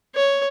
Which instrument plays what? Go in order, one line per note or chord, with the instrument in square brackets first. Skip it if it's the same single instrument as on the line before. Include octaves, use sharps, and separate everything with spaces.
[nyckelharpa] C#5